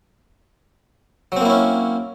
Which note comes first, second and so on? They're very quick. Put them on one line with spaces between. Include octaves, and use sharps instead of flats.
F#3 C4 A#3 E4 C#4